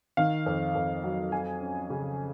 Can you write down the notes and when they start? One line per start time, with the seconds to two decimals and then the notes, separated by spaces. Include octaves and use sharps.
0.17 D#3 F5
0.46 F2
0.75 F2
1.03 F#3
1.32 F#3 G#5
1.61 C#4
1.90 C#3